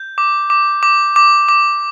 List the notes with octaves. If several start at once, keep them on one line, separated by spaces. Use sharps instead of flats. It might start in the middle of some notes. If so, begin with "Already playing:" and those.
Already playing: G6
D6
D6
D6
D6
D6